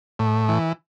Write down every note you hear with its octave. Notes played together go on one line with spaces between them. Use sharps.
A2
E3